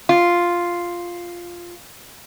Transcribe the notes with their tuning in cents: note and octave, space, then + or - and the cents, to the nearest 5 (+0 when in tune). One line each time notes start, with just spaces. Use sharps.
F4 +0